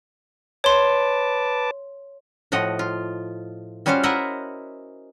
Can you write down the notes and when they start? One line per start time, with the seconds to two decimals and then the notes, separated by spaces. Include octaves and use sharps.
0.64 B4 C#5 A5 C6 D6
2.52 A2 F3 F#4 D#5
2.79 F4
3.86 G3 C#4 F4 F#4 C5 F5
4.03 E4 A#4 D#5 E5 F#5